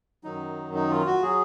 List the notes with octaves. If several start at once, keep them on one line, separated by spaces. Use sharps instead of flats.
F#2 D#3 F#3 D#4
D#4
F4
F#4
F#3 G#4